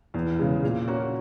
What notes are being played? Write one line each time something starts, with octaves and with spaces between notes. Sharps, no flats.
E2
C#3 G#3
A#2
A#3 C#4 F#4